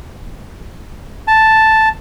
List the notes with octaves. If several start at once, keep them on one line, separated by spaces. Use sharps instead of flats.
A5